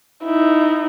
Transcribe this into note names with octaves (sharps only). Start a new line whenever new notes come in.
D#4 E4